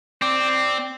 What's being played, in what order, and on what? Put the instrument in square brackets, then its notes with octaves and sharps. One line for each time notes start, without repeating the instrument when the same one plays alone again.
[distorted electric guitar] C4 [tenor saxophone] D5